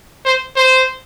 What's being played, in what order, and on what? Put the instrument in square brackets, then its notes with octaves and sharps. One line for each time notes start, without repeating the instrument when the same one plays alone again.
[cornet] C5
C5